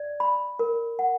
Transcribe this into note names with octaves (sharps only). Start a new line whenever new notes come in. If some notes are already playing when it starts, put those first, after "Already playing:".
Already playing: D5
B5
A#4
F#5